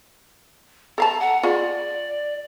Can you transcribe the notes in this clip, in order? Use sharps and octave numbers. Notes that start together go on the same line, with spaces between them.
A4 F5 A5 A#5
F#5
F4 G#4 D5